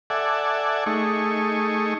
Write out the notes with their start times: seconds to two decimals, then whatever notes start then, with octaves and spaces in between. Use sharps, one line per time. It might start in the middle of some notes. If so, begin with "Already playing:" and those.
0.10 A4 D5 E5 F#5 G#5
0.86 A3 D#4 G#4 C#6